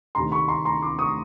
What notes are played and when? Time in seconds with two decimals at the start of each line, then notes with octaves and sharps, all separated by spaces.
0.15 D2 C3 D#3 A#5 C6
0.32 B5 C#6
0.48 A#5 C6
0.65 A#5 C6
0.82 C6 D6
0.99 C#6 D#6